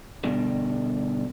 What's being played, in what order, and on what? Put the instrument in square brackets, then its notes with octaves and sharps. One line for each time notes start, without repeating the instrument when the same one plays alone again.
[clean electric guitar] G2 B2 D3